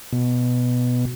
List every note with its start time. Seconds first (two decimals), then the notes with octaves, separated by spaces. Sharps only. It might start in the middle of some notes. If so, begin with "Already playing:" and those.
0.13 B2